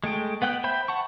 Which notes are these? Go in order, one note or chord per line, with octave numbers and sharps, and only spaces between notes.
G#3 A3 G5
B3 F#5 G5 F#6
C5 E5 G5 B5 G6
F#5 A5 C#6